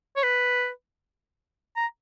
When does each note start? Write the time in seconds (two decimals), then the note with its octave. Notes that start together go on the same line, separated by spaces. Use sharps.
0.16 C#5
0.23 B4
1.76 A#5